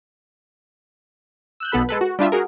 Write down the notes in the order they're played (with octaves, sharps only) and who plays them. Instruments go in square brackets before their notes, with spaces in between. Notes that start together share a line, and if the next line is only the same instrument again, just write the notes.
[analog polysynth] E6 F#6 G6
B1 B3 A4 B5
G#3 A4 B4
F#4
G3 D4 F4 E5
F#4 G#4 A#4